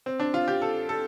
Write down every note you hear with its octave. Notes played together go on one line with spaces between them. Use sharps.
C4
D4
F4
G4
A4
A4